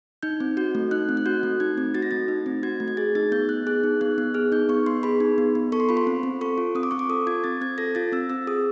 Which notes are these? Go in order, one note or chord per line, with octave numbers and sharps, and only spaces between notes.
D#4 G6
C4
F#4 G6
A3
D#4 F#6
C4
F#6
F#4 G6
A3
D#4 G#6
C4
F#4 A6
A#6
A3 A6
D#4
C4
F#4 G#6
A3
G#6
G#4 A6
D#4 A6
B3 G6
B3 F#6
G#4 F#6
D#4
B3 F#6
B3
G#4 F6
D#4 G6
B3 C#6
B3 C6
G#4 B5
D#4
B3
B3
A4 C#6
C6
F4 B5
C6
C4
C4
A4 C#6
F4
C4 D#6
D6
C4 C#6
D6
A4 D#6
F4 G#6
C4 A6
C4 G#6
A4 A#6
F4 A6
C4 E6
C4 E6
G#4 D#6